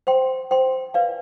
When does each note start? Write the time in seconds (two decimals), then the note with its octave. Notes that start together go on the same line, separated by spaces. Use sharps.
0.07 C5 G5 C6
0.51 C5 G5 C6
0.94 B4 D5 F5 G#5